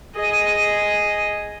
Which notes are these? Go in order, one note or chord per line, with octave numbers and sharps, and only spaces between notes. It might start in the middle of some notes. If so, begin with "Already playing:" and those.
G#4 D#5